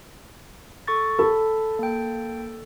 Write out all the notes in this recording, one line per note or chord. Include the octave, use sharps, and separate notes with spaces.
A4 C#6 A6
A4 B5
A#3 G5